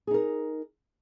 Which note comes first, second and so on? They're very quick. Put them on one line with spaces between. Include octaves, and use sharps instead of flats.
G#4 D#4 A#4